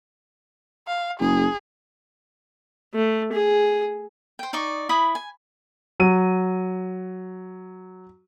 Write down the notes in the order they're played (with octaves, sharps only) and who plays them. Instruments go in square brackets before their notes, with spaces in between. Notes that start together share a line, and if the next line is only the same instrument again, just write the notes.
[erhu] F5
[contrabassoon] F#1 [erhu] G#4
[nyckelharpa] A3
G#4
[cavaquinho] C5 G5
D#4 D5 D#5 C#6
E4 B5 D#6
G#5
[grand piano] F#3 D#7